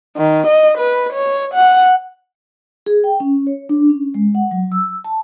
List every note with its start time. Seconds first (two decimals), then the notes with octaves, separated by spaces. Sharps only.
0.16 D#3
0.47 D#5
0.78 B4
1.12 C#5
1.54 F#5
2.86 G#4
3.04 G5
3.20 C#4
3.47 C#5
3.69 D4
3.89 C#4
4.14 G#3
4.35 F#5
4.51 F#3
4.72 E6
5.04 A5